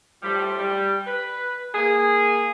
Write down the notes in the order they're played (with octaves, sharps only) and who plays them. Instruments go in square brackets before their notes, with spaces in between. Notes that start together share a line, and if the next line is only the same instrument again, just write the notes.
[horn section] A2 F3 G3
G3
B4
A#3 G#4